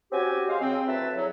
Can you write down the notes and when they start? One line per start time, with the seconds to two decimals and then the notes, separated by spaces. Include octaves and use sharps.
0.12 C4 C#4 F#4 G4 G#5
0.48 G#3 C5 F5
0.61 C#3 C4
0.87 D2 F#3 E4 B4 E5 A5
1.16 E2 F#3